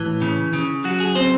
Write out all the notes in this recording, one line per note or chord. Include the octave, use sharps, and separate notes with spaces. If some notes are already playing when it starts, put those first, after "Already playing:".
Already playing: A2 E3
C#3
C#3
F#3 F#4
G#4
C4 C5